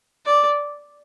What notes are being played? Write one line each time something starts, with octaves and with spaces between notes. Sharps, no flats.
D5